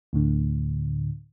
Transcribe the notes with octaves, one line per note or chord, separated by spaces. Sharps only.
D2 A2 D3